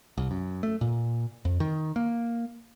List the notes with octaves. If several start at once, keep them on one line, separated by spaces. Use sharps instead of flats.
C2
F#2
A3
A#2
F2
D#3
A#3